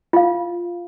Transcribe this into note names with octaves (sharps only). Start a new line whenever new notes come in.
F4 F5